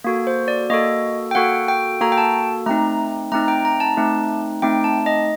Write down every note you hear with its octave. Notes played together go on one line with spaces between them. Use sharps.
A#3 F#4 A4
C5
D5
A#3 F#4 A4 D#5
G5
A#3 F#4 A4 F#5
G5
A#3 F#4 A4 A#5
G5
A5
A3 C4 D#4 A#5
A3 C4 D#4 A#5
G5
A#5
A5
A3 C4 D#4
A3 C4 D#4 G5
A5
D#5